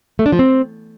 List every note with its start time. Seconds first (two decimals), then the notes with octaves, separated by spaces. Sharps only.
0.19 A3
0.26 D4
0.32 F3
0.39 C4